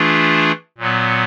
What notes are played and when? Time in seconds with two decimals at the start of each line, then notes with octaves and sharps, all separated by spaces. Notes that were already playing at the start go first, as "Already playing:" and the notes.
Already playing: E3 A3 D4 F4 G#4
0.78 A#2 F#3 B3